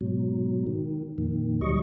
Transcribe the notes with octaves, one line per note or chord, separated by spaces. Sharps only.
G#2 B2 F#3
D#3
F2 A#2 D#3
D2 F#3 G3 D#5 C#6